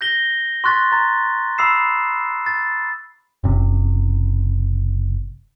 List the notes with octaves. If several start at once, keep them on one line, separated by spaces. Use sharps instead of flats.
G6 A#6 G7
C6 C#6 F#6 A6 B6
A#5 A6
B5 D#6 E6 C7 E7
A6
F#1 C3